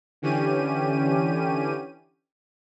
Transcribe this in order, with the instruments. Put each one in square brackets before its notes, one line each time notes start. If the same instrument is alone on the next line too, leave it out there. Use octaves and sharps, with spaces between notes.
[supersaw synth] D3 E3 C#4 G4 D#7